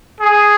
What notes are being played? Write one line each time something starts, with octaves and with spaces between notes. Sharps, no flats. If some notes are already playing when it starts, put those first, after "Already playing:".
G#4